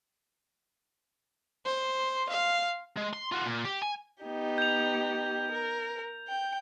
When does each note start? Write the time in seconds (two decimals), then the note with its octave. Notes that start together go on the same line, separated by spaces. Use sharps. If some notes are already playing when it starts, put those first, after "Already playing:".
1.65 C5
2.30 F5
2.96 G#3
3.13 C6
3.32 F4 F#4
3.46 A#2
3.65 G4
3.82 G#5
4.23 B3 D#4 G4
4.58 G6 F7
5.51 A#4
6.28 G5